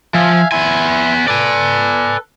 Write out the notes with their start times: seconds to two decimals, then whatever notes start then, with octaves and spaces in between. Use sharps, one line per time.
0.14 F3 E5 F5 G#5
0.52 B3 E4 G#5 C6
1.28 A4 B4 D5 G#5